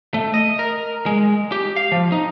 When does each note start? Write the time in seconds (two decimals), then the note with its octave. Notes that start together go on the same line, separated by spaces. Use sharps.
0.14 A3
0.34 D#5
0.59 A#4
1.06 G#3
1.52 G4
1.76 F5
1.92 F3
2.12 D#4